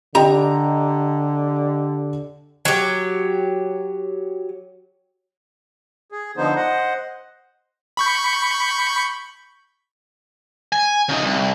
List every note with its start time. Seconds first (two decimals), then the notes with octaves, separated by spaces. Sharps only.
0.15 D3 G4 D#5 G5 A#5
2.65 F#3 G4
6.12 G#4
6.37 D3 F3 B3 D#4 C5
6.56 C5 D#5 F#5
7.97 B5 C#6 G6
10.72 G#5
11.09 C#3 D#4
11.23 C2